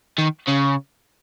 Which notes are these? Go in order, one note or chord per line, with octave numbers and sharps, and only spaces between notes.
D#3
C#3